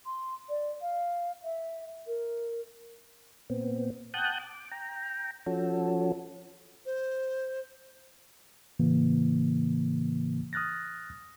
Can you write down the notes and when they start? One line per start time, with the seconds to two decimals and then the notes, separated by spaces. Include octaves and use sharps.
0.06 C6
0.49 D5
0.82 F5
1.44 E5
2.07 A#4
3.50 A#2 B3 C4
4.14 F#5 G5 A5 D#6 F#6 G6
4.40 D6
4.71 G5 A#5
5.46 F3 C#4 F#4 A4
6.86 C5
8.79 A2 C#3 E3 A#3
10.53 D#6 F6 F#6 A6 A#6